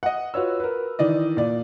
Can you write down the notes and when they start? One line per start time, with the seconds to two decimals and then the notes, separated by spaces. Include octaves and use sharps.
0.03 D#5 F#5
0.34 F4 F#4 B4 C#5 E6
0.60 A#4 B4
0.99 D#3 E3 D5 D#5
1.37 A#2 D5